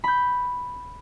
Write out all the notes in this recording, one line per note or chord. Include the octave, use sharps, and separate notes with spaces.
B5 G6